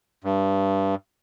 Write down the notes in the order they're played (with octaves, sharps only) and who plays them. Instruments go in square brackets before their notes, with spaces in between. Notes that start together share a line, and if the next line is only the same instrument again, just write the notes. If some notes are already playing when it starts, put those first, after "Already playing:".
[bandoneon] G2